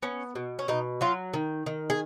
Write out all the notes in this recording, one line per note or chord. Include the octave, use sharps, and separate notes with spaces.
B3 C#4
B2
C#4
B2 D#4
F#3 F4
D#3
D#3
G#4